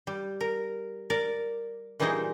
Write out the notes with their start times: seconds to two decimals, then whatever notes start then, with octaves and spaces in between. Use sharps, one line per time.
0.07 G3
0.41 A#4
1.10 A#4 D5
2.00 A#2 E3 G3 D#4 G#4 C5